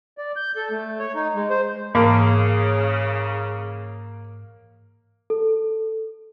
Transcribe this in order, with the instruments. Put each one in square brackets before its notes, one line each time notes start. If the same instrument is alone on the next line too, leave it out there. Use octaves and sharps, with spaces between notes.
[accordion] D5
G6
A4
A3
C#5
D#4
G#3
C5
[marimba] G#2 E3 A5 [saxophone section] C#3 [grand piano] A#3
[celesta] A4